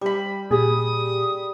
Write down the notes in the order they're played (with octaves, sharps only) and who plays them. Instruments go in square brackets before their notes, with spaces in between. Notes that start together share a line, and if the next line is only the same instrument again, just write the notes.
[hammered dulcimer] G3 B5
[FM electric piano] A#2 G4 [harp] G#4 [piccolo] D#6